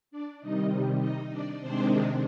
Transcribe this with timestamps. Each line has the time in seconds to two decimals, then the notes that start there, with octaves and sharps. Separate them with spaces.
0.11 D4 D5
0.41 C3 D#3 G3 D#4 D#5
1.01 D#4 D#5
1.30 D4 D5
1.61 C3 D#3 G#3 C4 D4 C5